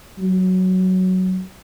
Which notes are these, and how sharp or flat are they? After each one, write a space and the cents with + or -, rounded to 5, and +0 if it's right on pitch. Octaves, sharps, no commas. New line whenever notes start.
F#3 +5